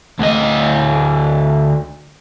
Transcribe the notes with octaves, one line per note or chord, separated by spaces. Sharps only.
D2 D#5